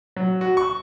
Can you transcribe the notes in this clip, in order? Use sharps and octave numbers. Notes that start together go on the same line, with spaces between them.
F#3
F#4
C#6